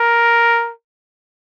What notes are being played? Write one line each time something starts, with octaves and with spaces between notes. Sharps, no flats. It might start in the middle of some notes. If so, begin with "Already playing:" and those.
Already playing: A#4